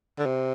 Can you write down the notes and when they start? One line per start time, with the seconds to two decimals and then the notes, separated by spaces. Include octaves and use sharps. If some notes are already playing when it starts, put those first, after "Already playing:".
0.19 D3
0.26 C3